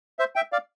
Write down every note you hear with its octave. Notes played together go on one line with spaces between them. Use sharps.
C5 E5
E5 G5
D5 F5